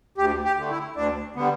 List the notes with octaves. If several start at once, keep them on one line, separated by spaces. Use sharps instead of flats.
D2 G4
G4
D3 A3
E4
D2 D4
D3 G3 B3